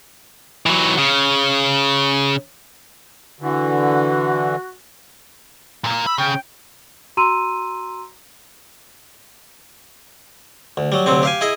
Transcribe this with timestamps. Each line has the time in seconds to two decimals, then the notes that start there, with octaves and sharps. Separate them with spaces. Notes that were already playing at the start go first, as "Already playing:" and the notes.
0.66 E3 F#3
0.98 C#3
3.41 D3 E3 F#4
5.84 A#2 A#3
6.06 B5 E6
6.18 C#3 G5
7.17 F#4 A#5 C6 E6 D#7
10.77 D2
10.92 F#3 G3
11.06 D2 C3 F#3 C4
11.23 G4 F5 G#5
11.41 E4 G#4 D#5